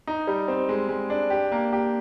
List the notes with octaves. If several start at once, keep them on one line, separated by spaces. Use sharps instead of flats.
D#4
G3
C4
G#3
G#3
D4
G4
A#3
G4